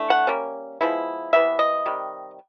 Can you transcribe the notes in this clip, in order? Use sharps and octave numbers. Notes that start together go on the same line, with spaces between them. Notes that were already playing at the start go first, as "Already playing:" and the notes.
Already playing: E3 A3 D4
F#5
G3 A#3 C#4
F3 G#3 B3 E4
C3 E3 B3 E5
D#5
C3 D#3 G3